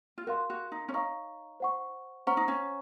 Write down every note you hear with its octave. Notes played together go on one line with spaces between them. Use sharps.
F4
F#4 A#4 F5 C6
F#4
D#4
C#4
D#4 C#5 F5 A#5 C#6
C5 F#5 C#6
C#4 C5 F#5 A#5 C#6
D#4
C#4